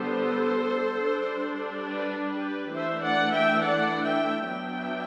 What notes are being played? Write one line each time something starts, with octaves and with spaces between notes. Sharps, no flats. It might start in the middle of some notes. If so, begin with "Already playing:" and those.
Already playing: D3 G3 B3 D4 A4 C5
G3 D4
B4 D5
G4 B4
E3 A3 D4 C5 E5
D5 F#5
E5 G5
D5 F#5
E5 G5
F#3 B3 D4 E5 G5